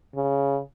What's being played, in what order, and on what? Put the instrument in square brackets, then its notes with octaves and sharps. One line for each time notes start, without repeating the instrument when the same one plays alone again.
[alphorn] C#3